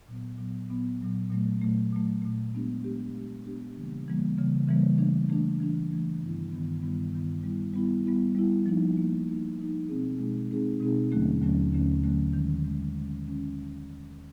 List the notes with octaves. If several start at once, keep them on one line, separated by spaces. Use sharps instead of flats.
A#2 F#3 B3
A#2 F#3 B3
A#2 F#3 B3
A#2 F#3 B3
A#2 F#3 A3
A#2 F#3 A3
A#2 F#3 A3
A#2 F#3 A3
G#3 B3 D4 G4
G#3 B3 D4 G4
G#3 B3 D4 G4
G#3 B3 D4 G4
C#3 E3 G3 A#3
C#3 E3 G3 A#3
C#3 E3 G3 A#3
C#3 E3 G3 A#3
E3 A3 D4
E3 A3 D4
E3 A3 D4
E3 A3 D4
G2 D#3 G3 B3 E4
G2 D#3 G3 B3 E4
G2 D#3 G3 B3 E4
G2 D#3 G3 B3 E4
G3 B3 E4
G3 B3 E4
G3 B3 E4
G3 B3 E4
F3 A#3 D#4
F3 A#3 D#4
F3 A#3 D#4
F3 A#3 D#4
B2 G#3 C4 D#4 G#4
B2 G#3 C4 D#4 G#4
B2 G#3 C4 D#4 G#4
B2 G#3 C4 D#4 G#4
D#2 D3 F#3 A3 C#4
D#2 D3 F#3 A3 C#4
D#2 D3 F#3 A3 C#4
D#2 D3 F#3 A3 C#4
D#3 G#3 C#4
D#3 G#3 C#4
D#3 G#3 C#4
D#3 G#3 C#4